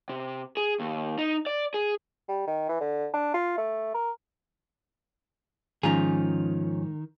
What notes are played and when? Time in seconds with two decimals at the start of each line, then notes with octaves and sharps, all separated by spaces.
0.09 C3
0.57 G#4
0.80 D#2
1.18 D#4
1.46 D5
1.74 G#4
2.29 G3
2.47 D#3
2.69 E3
2.81 D3
3.14 D4
3.34 F4
3.58 A3
3.94 A#4
5.83 G#2 D#3 F3 C#4 F4 G#4 A#5